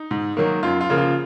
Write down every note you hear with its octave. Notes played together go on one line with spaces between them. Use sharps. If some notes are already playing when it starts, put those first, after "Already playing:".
Already playing: D#4
G#2
D#3 F#3 A#3
F#2 F4
F4
C#3 F3 A#3
F4